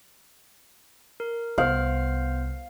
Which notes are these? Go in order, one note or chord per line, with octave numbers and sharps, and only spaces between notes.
A#4
C2 B3 C5 F5